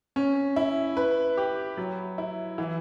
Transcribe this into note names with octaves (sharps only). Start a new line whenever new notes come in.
C#4
E4
B4
G4
F#3
E4
E3